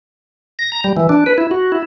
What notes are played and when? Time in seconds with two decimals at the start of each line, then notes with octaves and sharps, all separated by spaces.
0.59 A#6
0.72 A#5
0.84 G3
0.97 E3
1.09 D4
1.26 B4
1.38 E4
1.51 F#4
1.72 E4